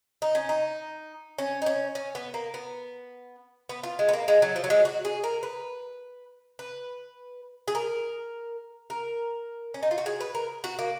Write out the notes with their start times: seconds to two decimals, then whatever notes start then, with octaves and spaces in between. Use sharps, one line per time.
0.22 D#4
0.35 C#4
0.49 D#4
1.38 C#4
1.62 D#4
1.66 C#4
1.95 C#4
2.15 B3
2.34 A#3
2.54 B3
3.69 B3
3.83 F4
3.99 G#3
4.08 B3
4.13 A#3
4.28 G#3
4.42 F#3
4.56 F3
4.64 F#3
4.70 G#3
4.85 F#4
5.05 G#4
5.24 A#4
5.43 B4
6.59 B4
7.68 G#4
7.75 A#4
8.90 A#4
9.74 C#4
9.83 D#4
9.91 F4
9.98 F#4
10.06 G#4
10.20 B4
10.35 A#4
10.64 F#4
10.79 A#3